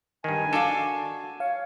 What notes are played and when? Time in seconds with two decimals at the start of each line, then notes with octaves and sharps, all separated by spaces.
0.24 G2 D#3 G#5
0.53 D4 F#4 A4 F5
1.40 C#5 F5